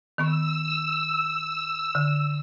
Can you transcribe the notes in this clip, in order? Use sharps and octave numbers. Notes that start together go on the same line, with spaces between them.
D#3 B3 C#6 E6
D3